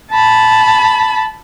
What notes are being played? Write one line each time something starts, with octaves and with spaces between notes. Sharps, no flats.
A5 B5